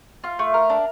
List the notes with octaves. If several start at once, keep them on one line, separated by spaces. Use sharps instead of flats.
F4
A3
A#4
D4